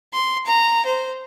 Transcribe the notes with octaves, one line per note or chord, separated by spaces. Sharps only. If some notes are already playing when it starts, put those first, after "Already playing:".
C6
A#5
C5